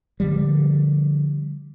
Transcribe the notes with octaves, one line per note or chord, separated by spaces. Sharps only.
D3 F3 G3